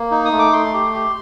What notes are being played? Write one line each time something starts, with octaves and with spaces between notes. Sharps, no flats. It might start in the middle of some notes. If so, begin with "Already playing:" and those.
Already playing: A#3
D#4
D#6
A3
D6
A3 C6
G4
G4